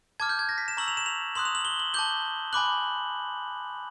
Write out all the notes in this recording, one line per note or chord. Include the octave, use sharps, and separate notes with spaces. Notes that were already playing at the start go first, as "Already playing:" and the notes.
A5 D6 F6 G#6
G6
G#6
A#6
B6
E7
A#5 C#6 E6 F#7
F7
E7
F7
C6 D#6 F#6 F#7
F7
F#7
G7
F#7
A5 D6 G6 G7
G#5 B5 D6 F#6 F#7